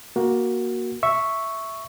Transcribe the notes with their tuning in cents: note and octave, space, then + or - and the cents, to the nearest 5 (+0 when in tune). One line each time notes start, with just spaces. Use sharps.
A#3 +10 F#4 +0
E5 +0 C#6 +0